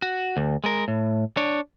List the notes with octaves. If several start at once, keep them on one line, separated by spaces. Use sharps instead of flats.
F#4
D2
G#3 A#4
A2
D4 C#5